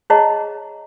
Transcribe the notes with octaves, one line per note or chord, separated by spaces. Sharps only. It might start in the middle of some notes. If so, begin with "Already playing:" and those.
G#4 C#5 D#5 F#5 A5 A#5